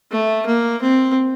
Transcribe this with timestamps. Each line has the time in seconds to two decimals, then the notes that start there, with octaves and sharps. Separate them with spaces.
0.11 A3
0.46 A#3
0.82 C4